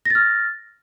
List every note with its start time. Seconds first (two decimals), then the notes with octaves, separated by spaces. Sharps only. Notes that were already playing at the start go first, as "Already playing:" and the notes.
0.05 A#6
0.10 A6
0.15 F6